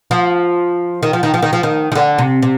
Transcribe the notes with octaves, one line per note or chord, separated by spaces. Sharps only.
F3
D#3
F3
D#3
F3
D#3
F3
D#3
D#3
D3
C3
C3